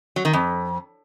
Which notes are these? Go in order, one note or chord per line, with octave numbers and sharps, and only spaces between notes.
F#3
D#3
F2